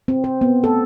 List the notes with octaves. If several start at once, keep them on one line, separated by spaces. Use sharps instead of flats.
C4
C5
B3
A4